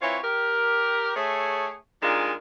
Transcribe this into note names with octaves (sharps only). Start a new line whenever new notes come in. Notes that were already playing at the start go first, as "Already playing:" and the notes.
E3 C4 F4 C#5
G4 A#4
A3 G#4 C#5
A#2 D#3 G3 G#3 D4 F4